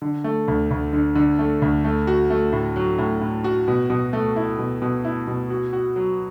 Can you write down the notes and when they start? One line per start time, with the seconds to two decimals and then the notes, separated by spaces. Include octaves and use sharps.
0.02 D3
0.24 A3
0.48 D2
0.71 D2
0.93 D3
1.15 D3
1.39 A3
1.62 D2
1.84 A3
2.07 F#4
2.30 A3
2.52 A2
2.76 F#3
2.98 A2
3.21 A2
3.44 F#4
3.68 B2
3.90 B2
4.13 A3
4.36 E4
4.59 B2
4.82 B2
5.05 E4
5.27 B2
5.50 F#4
5.73 F#4
5.96 F#3